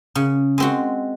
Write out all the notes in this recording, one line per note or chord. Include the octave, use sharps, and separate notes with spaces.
C#3
G#3 C4 F#4